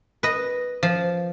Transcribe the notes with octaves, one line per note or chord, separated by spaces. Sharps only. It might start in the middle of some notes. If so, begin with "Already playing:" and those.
B4 D#5
F3